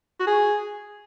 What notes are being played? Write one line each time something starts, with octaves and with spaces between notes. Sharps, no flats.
F#4
G#4